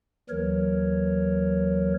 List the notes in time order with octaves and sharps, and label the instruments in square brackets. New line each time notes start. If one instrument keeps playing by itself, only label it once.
[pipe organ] D#2 E3 F#3 A#4 C#5